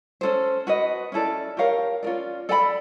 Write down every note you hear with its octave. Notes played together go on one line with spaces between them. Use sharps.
C#4 F4 A4 C5
F#4 B4 D#5
C#4 E4 A4 D5
G4 A#4 C#5 F5
C#4 F4 A#4 D5
A4 D5 G5 B5